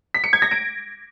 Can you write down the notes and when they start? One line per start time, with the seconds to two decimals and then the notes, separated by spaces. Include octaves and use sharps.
0.14 B6
0.24 C#7
0.33 G#6
0.42 A#6
0.51 D7